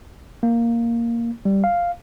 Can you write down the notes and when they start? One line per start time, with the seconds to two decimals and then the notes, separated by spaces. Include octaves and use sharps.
0.43 A#3
1.45 G3
1.64 F5